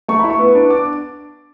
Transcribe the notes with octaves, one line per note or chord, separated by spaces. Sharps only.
A3 C#6
E4 B5
C#6
B3
D4
D6